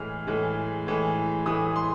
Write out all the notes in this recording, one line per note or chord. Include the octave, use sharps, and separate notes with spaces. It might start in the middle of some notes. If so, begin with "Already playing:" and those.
Already playing: A2 E3 G#3 F6
A2 E3 G#3
A2 E3 G#3
A2 E3 G#3 D#6
C6